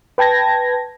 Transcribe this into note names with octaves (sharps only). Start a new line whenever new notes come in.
B4 G5 A5 G#6 A#6